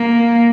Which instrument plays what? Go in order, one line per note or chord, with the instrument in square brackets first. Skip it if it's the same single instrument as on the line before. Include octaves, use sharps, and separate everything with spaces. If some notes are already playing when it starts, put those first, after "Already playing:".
Already playing: [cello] A#3